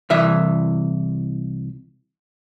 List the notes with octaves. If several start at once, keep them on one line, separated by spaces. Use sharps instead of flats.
C2 E3 E5